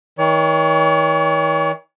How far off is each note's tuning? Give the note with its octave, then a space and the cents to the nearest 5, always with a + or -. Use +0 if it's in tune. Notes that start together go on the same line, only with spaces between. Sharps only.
D#3 +45 C#5 +40